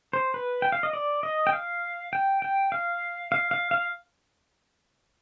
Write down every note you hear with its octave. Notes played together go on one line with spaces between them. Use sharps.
C5
B4
G5
F5
D#5
D5
D#5
G5
F5
G5
G5
F5
F5
F5
F5